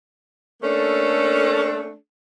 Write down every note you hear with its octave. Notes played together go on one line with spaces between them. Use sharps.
A3 A#3 C#4 D4 A4